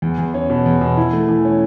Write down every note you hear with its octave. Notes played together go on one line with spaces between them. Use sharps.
E2
E2
C#4
B2
E2
B2
E4
A3
E3
C#4